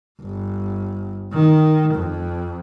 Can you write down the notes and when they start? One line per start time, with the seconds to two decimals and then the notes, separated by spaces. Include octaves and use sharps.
0.21 G1
1.33 D#3
1.94 F2